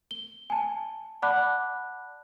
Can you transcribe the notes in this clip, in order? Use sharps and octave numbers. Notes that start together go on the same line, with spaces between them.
G7
G#5 A5
D5 F#5 A5 B5 D6 F#6